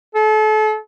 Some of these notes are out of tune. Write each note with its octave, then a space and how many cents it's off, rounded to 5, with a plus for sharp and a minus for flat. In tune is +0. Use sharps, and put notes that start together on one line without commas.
A4 -35